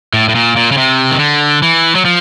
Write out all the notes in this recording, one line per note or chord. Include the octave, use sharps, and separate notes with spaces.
A2
A2
A#2
A#2
C#3
C3
D#3
D3
E3
F#3
F3